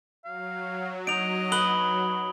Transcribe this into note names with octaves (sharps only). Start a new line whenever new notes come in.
F#3 F5
D#4 D#5 D7 F7
B4 D#6 F#7 G7